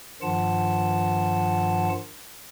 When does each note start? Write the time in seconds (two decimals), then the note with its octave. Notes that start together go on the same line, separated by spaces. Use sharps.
0.22 G2 D#3 F3 F4 F#5 A5